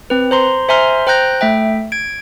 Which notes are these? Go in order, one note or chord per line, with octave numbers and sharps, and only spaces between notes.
C4 B4
C5 A#5 C6
C5 E5 G#5 A#5 C6 F6
C5 G5 A#5 F#6 G6 A#6
A3 E5 G5
G#6 D7